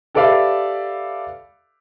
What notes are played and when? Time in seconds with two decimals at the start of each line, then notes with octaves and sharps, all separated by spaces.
0.15 G4 A4 B4 D5 E5 F5